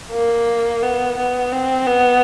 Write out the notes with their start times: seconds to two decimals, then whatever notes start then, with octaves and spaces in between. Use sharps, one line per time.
0.12 A#3
0.82 B3
1.17 B3
1.52 C4
1.87 B3